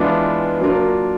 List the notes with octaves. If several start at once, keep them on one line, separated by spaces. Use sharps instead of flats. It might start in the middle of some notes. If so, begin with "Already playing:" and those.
Already playing: E3 G#3 B3 D4 F4
F#3 A#3 D4 F4 A#4